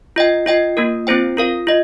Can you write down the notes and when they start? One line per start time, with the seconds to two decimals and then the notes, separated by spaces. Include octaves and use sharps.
0.16 F4 D#5 G5
0.46 F4 D#5 G5
0.77 A#3 F4 A#4
1.07 C4 F4 C5 G5
1.37 F4 A#4 F5
1.67 F4 D#5